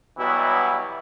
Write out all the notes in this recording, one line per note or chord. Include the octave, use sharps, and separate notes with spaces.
B2 E3 F#3 G3 B3 E4